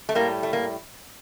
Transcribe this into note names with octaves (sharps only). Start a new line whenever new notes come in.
A3
A2 G3 A#3
A3
A#3